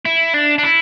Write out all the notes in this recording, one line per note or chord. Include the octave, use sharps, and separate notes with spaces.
E4
D4
D4
E4